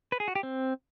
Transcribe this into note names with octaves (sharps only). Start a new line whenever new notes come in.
B4
G#4
F#4
G4
C4